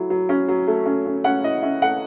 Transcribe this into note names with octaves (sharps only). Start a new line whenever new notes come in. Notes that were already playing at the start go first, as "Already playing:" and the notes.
Already playing: F#3 A3 E4
F#3
C#4
F#3
A3
C#4
C#4
C#4 F#5
E4 D#5
C#4 E5
A3 F#5